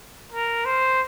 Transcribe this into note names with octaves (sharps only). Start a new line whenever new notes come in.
A#4
C5